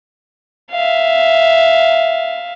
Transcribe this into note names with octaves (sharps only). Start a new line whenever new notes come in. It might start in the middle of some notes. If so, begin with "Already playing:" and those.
E5 F5